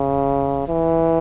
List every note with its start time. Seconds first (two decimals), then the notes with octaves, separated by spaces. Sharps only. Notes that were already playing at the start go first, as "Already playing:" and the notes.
Already playing: C#3
0.69 E3